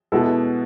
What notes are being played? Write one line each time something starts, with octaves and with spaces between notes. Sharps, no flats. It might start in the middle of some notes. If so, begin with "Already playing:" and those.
B2 G#3 B3 E4 A4